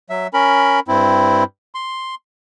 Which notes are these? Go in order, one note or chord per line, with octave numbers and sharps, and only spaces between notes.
F#3 E5
C#4 A#4 B5
G2 C4 E4
C6